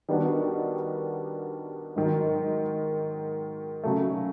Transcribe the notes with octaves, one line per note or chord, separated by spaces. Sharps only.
D#3 G3 B3 D4 F#4
G#2 D#3 F#3
C#3 F#3 A3